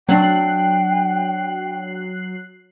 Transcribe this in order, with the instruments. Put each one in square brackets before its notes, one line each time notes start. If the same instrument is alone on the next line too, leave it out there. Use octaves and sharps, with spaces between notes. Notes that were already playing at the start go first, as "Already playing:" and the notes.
[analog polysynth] F#3 F#6 C7 [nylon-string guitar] C4 D4 [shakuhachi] G5